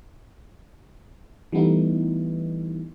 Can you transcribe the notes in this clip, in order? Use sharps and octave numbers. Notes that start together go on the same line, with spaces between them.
E3 G3 A3 B3 D#4 E4